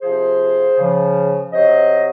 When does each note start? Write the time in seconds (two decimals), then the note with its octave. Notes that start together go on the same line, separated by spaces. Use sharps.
0.01 C3 F3 G#4 C5
0.78 C#3 F3
1.52 C3 F#3 C5 D#5